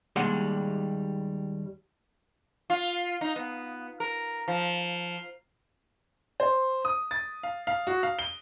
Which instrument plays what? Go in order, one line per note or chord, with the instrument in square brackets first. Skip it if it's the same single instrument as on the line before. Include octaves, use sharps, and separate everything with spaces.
[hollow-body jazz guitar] D#2 G3 G#3 D4 F#5 C6
[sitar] F4
D#4
B3
A#4
F3
[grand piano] C5
D#6
A6
F5
F5
F#4
F5
G7